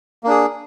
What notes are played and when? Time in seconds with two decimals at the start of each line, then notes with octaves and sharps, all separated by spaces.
0.24 A#3
0.27 D4
0.30 G#4